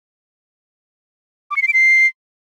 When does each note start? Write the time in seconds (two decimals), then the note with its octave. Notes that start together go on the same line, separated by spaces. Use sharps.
1.51 D6
1.56 C#7
1.62 C7
1.68 D7
1.73 C7